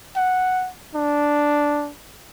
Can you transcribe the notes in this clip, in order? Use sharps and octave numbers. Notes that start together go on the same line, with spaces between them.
F#5
D4